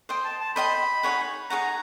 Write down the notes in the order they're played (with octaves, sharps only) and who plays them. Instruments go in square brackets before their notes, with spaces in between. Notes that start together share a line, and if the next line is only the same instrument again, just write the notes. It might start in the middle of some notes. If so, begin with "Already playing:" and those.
[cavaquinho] C5 D#5 G5 C6
[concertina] A5
A5
[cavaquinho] C5 D#5 G5 C6 [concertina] B5
[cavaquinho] D#4 G#4 C#5 F#5
[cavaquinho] D#4 G#4 C#5 F#5 [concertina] A#5